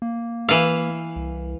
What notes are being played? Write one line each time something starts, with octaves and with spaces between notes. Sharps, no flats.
A#3
E3 F5
C2